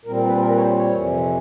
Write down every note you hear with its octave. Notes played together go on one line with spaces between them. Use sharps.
A#2 G3 C4 A#4
B4
A#4
B4
C#5
C5
C#5
F2 C3 E3